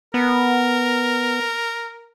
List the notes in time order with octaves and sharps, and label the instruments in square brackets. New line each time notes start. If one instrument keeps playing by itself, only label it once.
[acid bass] B3 [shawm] A#4